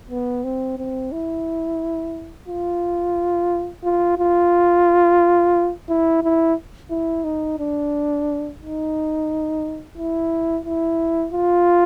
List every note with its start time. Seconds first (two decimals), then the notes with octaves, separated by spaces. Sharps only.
0.11 B3
0.44 C4
0.78 C4
1.12 E4
2.48 F4
3.84 F4
4.18 F4
5.89 E4
6.23 E4
6.90 E4
7.24 D#4
7.59 D4
8.62 D#4
9.98 E4
10.66 E4
11.33 F4